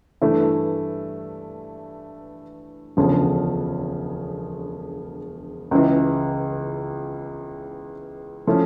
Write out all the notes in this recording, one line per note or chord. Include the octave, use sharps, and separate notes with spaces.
G2 E3 A3 E4
E1 D2 C#3 F3 C#4
C#2 C#3 E3
F3 A3 C#4 E4